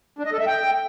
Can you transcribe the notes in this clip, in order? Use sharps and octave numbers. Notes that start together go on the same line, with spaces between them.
D4
D#5
A4
E5
G5